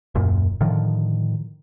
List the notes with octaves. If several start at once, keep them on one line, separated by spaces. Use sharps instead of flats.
D#1 F#2 A#2
A2 D3 D#3 F3